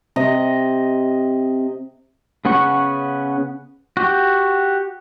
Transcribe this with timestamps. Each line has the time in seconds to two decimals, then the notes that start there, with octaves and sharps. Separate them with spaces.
0.16 C3 D#5
2.45 C#3 B3 C#4 F#5 C#6
3.97 F#4 G4